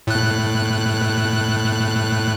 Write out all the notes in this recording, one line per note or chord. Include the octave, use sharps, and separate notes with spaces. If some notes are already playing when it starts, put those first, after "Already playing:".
A2 F#6